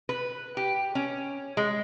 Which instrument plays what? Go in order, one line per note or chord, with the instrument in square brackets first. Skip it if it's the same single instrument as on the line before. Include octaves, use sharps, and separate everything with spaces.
[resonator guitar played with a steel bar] B4
G4
C#4
G#3